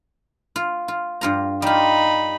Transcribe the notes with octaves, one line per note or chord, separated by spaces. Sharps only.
F4
F4
G2 F4 A#5
G3 D#4 F4 B5